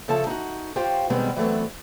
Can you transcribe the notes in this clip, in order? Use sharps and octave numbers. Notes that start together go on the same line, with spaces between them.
C#3 F3 A4 C#5 E5 A5
D#4 F#4
F4 G4 C5 C#5 F5 G5
B2 D#3 G3 G#3 B3 C4
E3 F#3 A3 B3 C4